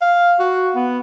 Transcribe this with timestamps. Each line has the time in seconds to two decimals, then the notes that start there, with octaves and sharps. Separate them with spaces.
0.01 F5
0.39 F#4
0.75 B3